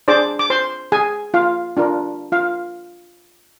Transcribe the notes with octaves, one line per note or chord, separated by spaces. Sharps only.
D4 G#4 C5 D5 D6
D6
C5 C6
G#4 G#5
F4 F5
D4 F4 A#4
F4 F5